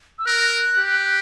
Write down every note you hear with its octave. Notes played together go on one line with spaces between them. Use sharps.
E6
A#4 F#6
G4